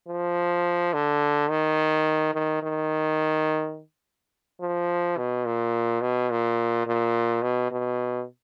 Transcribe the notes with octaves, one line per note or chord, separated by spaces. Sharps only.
F3
D3
D#3
D#3
D#3
F3
B2
A#2
B2
A#2
A#2
B2
B2